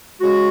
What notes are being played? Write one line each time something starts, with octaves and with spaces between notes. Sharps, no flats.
C#3 G#3 F#4